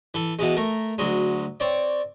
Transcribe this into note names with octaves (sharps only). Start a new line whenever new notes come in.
E3 A4
B2 E3 G#3
A3 A#4
D2 F#3 G#3
C4 C#5 D5